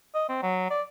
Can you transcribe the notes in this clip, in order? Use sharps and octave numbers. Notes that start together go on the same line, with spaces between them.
D#5
C4
F#3
D5